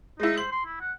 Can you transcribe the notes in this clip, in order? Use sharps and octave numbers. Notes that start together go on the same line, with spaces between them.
G#3 D#4 E4
C5 F#7
C6
E4
F#5